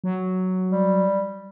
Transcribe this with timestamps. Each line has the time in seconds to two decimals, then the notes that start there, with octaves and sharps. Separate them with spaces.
0.04 F#3
0.71 G3